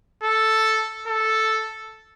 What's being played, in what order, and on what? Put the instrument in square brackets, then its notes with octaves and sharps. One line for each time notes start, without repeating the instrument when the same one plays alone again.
[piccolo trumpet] A4
A4